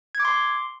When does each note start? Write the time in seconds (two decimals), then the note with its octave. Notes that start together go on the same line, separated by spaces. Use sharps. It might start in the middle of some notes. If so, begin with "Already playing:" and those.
0.15 G#6
0.20 D6
0.25 C6